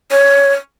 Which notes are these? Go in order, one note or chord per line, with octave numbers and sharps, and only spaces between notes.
C#5